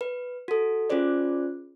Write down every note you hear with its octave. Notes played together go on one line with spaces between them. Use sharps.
B4
F#4 A4
C#4 F4 G#4 C5 D5